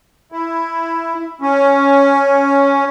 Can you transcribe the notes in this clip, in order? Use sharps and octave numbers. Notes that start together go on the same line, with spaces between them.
E4
C#4